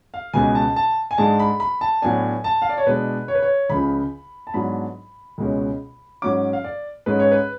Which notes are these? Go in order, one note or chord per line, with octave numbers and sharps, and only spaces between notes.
F5
C#2 B2 G#3 B3 G#5
A5
A5
G#5
G#2 G#3 D4 A5
B5
B5
A5
A2 F#3 B3 D4 G#5
A5
F5
D5
C#5
B2 G#3 D4 B4
C#5
B4
C#5
C#2 C#3 F3 B5
A5
G#2 F#3 B3 D4 B5
C#2 B2 G#3 C#4
G#2 F#3 C#4 D6
F5
D5
G#2 G#3 C#4 B4
C#5
B4